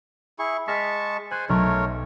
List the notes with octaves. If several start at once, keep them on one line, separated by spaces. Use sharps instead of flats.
E4 G#4 C#6
G#3 A5 C#6 F6 A#6 B6
C5 G#5 F#6
B1 A3 A#4 C#5